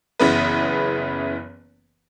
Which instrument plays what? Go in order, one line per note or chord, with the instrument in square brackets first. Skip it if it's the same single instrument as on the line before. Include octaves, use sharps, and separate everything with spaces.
[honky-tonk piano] F#1 C#3 E3 B3 E4 B4